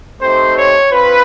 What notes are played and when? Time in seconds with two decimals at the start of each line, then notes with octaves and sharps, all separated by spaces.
0.21 A3 C4 D#4 G4 C5
0.57 C#5
0.92 C4 F4 B4